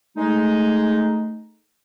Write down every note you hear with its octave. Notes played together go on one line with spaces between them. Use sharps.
G#3 A3 D#4